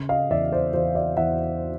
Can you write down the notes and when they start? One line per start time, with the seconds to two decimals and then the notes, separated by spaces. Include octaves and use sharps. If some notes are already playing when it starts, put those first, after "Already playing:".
Already playing: C#3
0.09 D#5 F5
0.30 E2 D5 E5
0.52 C5 D5
0.73 E2 C5 D5
0.95 D5 E5
1.17 E2 E5 F#5